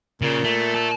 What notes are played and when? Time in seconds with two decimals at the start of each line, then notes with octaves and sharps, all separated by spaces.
0.22 A#2 C#3
0.44 A3
0.75 E5 A5